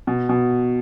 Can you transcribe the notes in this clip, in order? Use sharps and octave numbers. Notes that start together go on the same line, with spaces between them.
B2
B2